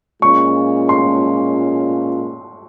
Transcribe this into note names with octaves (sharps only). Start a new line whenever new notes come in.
A#2 G#3 C#4 F4 C#6
C6